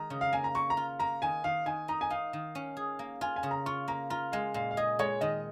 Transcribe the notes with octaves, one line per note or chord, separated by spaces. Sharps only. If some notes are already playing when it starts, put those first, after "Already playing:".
Already playing: D#3 G#3 A#5
C#3
F5
A#3 G#5
A#5
A#3 C#6
A#5
F4
A#3 A#5
D#3 G#5
D#3 F5
D#3 G#5
D#4 A#5
G#5
D#4 F5
D#3
C#4
G#4
A#3
F4 G#5
G#5
C#3
A#5
F4 C#6
A#3 A#5
F4 A#5
G#3 F5
A#2 F5
F5
G#4 D#5
G#3 C#5
D#3 D#5